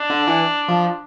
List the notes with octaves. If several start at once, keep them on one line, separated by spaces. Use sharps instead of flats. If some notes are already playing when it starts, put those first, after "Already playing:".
Already playing: D4
D3
E3
F3